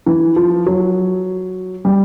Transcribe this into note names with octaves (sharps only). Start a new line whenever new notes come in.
E3
F3
F#3
G3